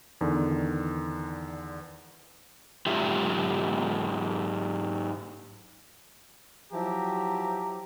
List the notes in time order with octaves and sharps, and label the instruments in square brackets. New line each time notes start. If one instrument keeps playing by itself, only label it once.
[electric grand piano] E2 D3 D#3
[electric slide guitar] G#2 F#3 F4 G4 E5
[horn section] F3 F#3 E4 G4 A#5